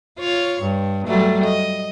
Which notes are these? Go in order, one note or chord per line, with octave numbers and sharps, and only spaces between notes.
F4 C#5
G2
F#3 G3 A3
D#5